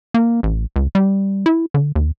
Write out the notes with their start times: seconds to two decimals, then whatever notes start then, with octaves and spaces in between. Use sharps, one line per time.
0.14 A#3
0.43 A1
0.76 C#2
0.95 G3
1.46 E4
1.74 D3
1.95 D#2